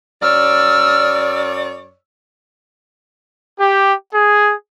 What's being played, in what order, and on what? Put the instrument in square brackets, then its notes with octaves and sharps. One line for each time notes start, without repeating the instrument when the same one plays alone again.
[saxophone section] F#2 C#5 D5 [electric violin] E6 F6
[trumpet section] G4
G#4